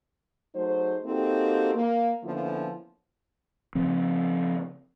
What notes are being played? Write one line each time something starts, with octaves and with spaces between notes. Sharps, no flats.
F#3 A3 D#4 G#4 C5
A#3 C4 D#4 F#4 G4 A4
A#3
D3 F3 A#3 B3 C#4 E4
C#3 F3 C4